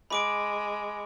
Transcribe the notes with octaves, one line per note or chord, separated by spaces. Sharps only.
G#3 B5 D6 D7